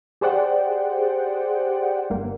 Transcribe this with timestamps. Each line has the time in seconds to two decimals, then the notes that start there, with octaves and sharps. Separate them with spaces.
0.21 G4 G#4 C5 D5 F#5 G5
2.10 G1 A#3